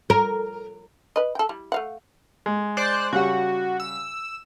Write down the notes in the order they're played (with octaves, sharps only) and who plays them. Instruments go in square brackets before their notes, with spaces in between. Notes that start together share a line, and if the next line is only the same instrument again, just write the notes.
[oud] A#4
[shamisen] B4 D#5
A4 G5
G3 E4
A3 F5 F#5
[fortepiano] G#3
[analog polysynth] C5 D5 F#6
[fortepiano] C#3 G3 F#5 [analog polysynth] F#4
[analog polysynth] E6